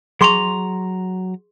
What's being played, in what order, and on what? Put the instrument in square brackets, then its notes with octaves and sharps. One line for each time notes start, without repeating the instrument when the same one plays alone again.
[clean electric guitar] F#3 A#5 [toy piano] G#4 C6 C#6